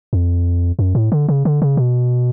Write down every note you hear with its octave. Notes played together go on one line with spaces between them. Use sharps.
F2
F#2
A2
D3
C#3
D3
C#3
B2